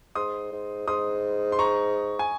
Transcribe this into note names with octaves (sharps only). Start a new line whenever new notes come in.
G#2 C6 D#6
G#2
G#2 C6 D#6
C6
A#5 C#6
G#5